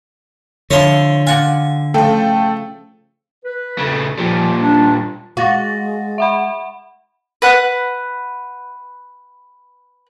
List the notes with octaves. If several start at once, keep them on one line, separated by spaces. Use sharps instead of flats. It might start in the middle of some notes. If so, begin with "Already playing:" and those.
D3 F3 E4 C#5 C6
F4 F#4 D5 G#5
C#3 F3 A3 A4 G5
B4
C#3 A3
A#2 F3 G3
D4
G#3 F#4 F5 A6 A#6
E5 F#5 B5
B4 F#5 F#6